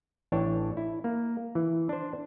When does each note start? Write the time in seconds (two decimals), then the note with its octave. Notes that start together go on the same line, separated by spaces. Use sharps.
0.32 A1 E3 D4 C#5 G5 A5
0.77 E4
1.04 A#3
1.55 E3
1.89 D4 C5